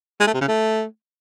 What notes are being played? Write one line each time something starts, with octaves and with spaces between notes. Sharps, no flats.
G#3
A3
C3
C#3
A3